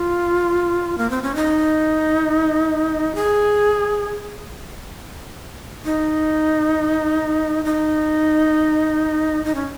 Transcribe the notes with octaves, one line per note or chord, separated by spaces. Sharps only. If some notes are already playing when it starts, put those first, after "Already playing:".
Already playing: F4
A#3
C4
C#4
D#4
G#4
D#4
D#4
D#4
C#4